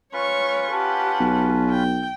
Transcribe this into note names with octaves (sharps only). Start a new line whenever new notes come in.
C#4 F4 B4 C#5 C#6
G4 F#5 A5
B1
G5